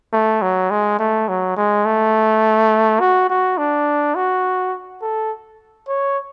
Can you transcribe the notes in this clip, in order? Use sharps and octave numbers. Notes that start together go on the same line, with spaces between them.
A3
F#3
G#3
A3
F#3
G#3
A3
F#4
F#4
D4
F#4
A4
C#5